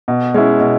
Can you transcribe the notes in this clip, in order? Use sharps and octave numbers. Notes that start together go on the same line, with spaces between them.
B2
G#3 C#4 E4
B2